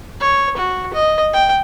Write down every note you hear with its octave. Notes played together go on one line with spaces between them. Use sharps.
C#5
F#4
D#5
G5